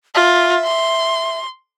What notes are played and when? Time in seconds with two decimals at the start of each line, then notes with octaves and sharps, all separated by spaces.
0.15 F4 E5
0.64 C6